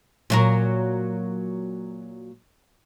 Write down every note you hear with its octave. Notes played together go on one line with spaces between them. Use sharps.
A#2 F#3 A#4